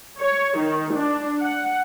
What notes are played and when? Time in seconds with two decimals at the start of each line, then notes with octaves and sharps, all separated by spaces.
0.19 C#5
0.57 D#3
0.94 D4
1.42 F#5